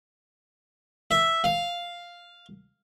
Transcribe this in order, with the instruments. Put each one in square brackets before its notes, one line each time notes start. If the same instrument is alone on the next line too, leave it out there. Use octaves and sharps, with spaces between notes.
[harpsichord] E5
F5